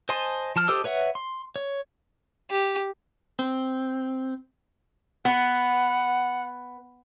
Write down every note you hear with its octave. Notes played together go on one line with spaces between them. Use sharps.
C5 D#5 G#5 A5 C6
F3 A5 F6
G4 A4 C5 D#5 E6
B4 C#5 E5 F#5
C6
C#5
G4
C4
B3 F#5